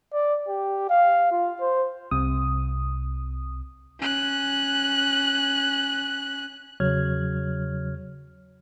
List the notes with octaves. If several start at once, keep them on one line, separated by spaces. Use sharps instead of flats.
D5
G4
F5
F4
C5
C2 C3 D#6
C#4 F#6
E2 C#3 F#3 C#5 F6 G#6